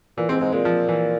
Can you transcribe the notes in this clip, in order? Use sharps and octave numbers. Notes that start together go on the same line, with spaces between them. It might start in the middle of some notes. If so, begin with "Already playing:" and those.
A#2 E3
G#2 C4
G#2 G#3
A#2 G#3
F3
E3